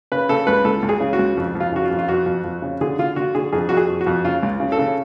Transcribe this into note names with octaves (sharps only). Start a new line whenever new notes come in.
C#3 B4
C#3 A4
C#2 B4
C#2 A4
C#2
G#4
C#3
F#4
C#2
F2
F2
F4
C#3 F#4
F4
F2
F4
F2 F#4
F2
F2
C#3
D3 G#4
D3 F4
D3 F#4
D3 G#4
F2 G#4
F2 F#4
G#4
F2
F#4
F2
C#3 F4
C#2
C#3
A4
C#3